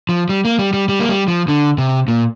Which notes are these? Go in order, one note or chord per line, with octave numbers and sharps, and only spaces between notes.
F3
G3
A#3
G3
G3
G3
A#3
G3
F3
D3
C3
A#2